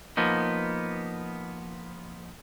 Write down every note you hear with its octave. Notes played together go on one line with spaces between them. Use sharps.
F3 A#3 B3 D#4